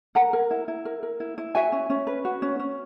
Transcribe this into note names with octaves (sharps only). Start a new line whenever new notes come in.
A#4 F#5 A#5
A#4
E4
E4
A#4
A#4
E4
E4
F#4 E5 G#5
C#4
C#4
B4
F#4
C#4
C#4